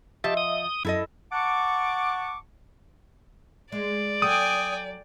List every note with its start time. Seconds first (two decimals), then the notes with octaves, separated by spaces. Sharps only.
0.24 F3 G4 D#5 E5 A5
0.37 D#6
0.85 F#2 E4 A4 D#5
1.33 F#5 A5 C#6 D6
3.72 G#3 D5
4.22 F#3 A4 G5 G#5 D#6